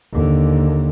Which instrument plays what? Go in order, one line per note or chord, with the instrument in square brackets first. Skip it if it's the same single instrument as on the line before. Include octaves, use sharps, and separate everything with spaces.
[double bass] D#2 D3